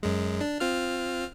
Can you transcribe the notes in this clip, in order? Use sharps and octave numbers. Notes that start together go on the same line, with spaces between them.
F#2 G#3
D4
C4 F4 F6